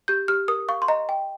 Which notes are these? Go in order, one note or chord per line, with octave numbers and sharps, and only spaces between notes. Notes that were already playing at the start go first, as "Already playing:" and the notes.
G4 G6
G4 F6
A#4 D#6
F5 C#6
C6
D#5 A#5
G5